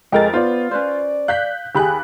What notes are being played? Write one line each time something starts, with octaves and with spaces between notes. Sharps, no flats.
F2 G#3 A4 A#4 D#5 G5 A6
B3 F4 C5 D5
C#4 B4 C5 D5
F5 F#6 G6 B6
D#2 G4 G#4 G#5 B5 F#6